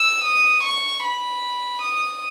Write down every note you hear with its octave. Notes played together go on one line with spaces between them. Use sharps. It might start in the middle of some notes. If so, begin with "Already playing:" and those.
Already playing: E6
D#6
C#6
B5
D#6